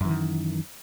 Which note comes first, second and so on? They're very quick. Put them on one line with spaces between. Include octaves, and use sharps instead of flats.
F#2 E3 D#3